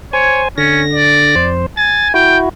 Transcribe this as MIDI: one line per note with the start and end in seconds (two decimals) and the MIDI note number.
0.13 0.48 72
0.13 0.41 73
0.13 0.48 80
0.58 1.35 50
0.58 0.82 61
0.58 1.35 94
0.94 1.51 74
1.36 1.66 41
1.36 1.66 72
1.77 2.12 80
1.77 2.08 93
2.14 2.49 64
2.14 2.49 66
2.14 2.38 79